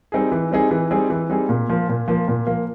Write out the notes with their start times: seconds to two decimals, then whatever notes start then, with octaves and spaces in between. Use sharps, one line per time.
0.12 G3 C4 D#4 G#4
0.32 E3
0.51 G3 C4 D#4 G#4
0.71 E3
0.91 G3 C4 D#4 G#4
1.10 E3
1.30 G3 C4 D#4 G#4
1.49 A#2
1.69 F3 A#3
1.89 A#2
2.08 F3 A#3
2.28 A#2
2.47 F3 A#3